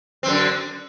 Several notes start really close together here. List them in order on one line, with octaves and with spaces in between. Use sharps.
C4 F#2 D3